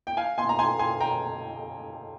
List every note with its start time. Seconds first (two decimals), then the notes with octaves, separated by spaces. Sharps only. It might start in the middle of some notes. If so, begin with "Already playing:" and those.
0.07 G5
0.17 F5 G#5
0.38 G#5 C6
0.49 A#5
0.59 G#5 C6
0.79 G#5 C6
1.00 G5 A#5